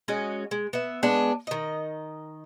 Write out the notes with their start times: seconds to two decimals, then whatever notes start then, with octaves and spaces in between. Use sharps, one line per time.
0.08 G#3 C#4 F#4 D#5
0.51 G#3
0.73 B3 E5
1.03 G#3 B3 D4
1.47 D#3 D#5